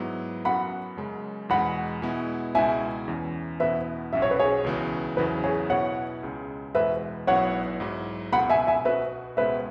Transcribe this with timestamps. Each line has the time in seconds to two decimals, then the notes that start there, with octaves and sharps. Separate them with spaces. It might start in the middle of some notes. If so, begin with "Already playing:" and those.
Already playing: G#2 F#3 B3 E4
0.45 F#2 F#3 B3 F#4 F#5 B5
0.97 F#2 C#3 G#3
1.49 E2 B2 G#3 F#5 B5
2.02 B2 G#3 B3 E4
2.55 C#2 B2 G#3 E4 E5 G#5
3.08 E2 E3 C#4
3.60 E2 B2 B3 E4 B4 E5
4.13 B1 B2 F#3 C#4 E5
4.22 C#5
4.31 B4
4.40 G#4 C#5
4.64 C#2 C#3 E3 B3 F#4
5.17 E2 C#3 F#3 B3 E4 B4
5.44 G#4 C#5
5.70 B2 B3 E4 C#5 F#5
6.23 C#2 C#3 G#3
6.75 E2 B2 G#3 B4 E5
7.27 B1 B2 F#3 B3 E4 C#5 F#5
7.80 G#2 F#3 E4
8.33 C#2 B2 B3 F#5 B5
8.50 E5 G#5
8.67 E5 G#5
8.85 B2 B3 F#4 B4 E5
9.37 C#2 B2 G#3 B3 B4 E5